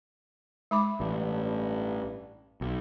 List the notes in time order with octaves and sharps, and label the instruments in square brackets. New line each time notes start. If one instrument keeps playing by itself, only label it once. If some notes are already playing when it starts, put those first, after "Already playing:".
[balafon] G#3 B5 D6
[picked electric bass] A1 [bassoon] G2
[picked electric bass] B1